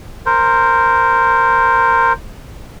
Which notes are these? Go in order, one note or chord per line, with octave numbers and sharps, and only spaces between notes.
A#4 C5